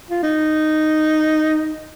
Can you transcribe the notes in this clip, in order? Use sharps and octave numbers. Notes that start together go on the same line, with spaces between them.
F4
D#4